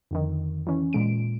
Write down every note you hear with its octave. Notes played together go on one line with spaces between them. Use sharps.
F2 D3 D#3
E3 C#4
A#2 G#3 D7